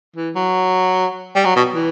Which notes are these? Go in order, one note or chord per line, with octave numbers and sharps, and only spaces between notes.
E3
F#3
G3
F#3
B2
E3